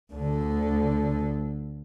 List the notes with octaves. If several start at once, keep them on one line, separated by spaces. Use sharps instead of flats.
D2 D3